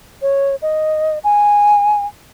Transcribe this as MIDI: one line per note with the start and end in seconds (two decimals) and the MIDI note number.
0.22 0.56 73
0.62 1.19 75
1.24 2.06 80